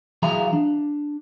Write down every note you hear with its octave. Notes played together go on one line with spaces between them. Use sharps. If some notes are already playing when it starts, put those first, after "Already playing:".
E3 F#3 G#4 E5 F5 A#5
D4